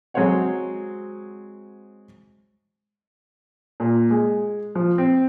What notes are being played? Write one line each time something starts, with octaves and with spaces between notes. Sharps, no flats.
F#3 G#3 C4 C5 C#5 F#5
A#2
G#3
F3
C4